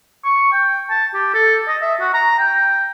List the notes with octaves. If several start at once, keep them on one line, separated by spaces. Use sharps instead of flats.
C#6
G5
A5
G4
A4
D#5
E5
F#4
A#5
G5